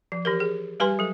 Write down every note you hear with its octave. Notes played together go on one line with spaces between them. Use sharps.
F3
E3 G4 A#4
G#4
G3 G4 B4 G#5 C6
F#3 A4